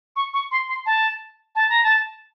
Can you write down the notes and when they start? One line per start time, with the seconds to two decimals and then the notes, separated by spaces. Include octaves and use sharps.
0.16 C#6
0.33 C#6
0.51 C6
0.68 C6
0.86 A5
1.55 A5
1.70 A#5
1.83 A5